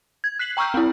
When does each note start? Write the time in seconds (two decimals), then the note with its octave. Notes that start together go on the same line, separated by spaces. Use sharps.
0.24 G#6
0.39 F#6 B6 C7 F#7
0.57 G5 A#5 C#6 E6 F6 G6
0.74 C4 E4